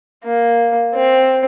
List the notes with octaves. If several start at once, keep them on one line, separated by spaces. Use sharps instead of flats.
A#3
C4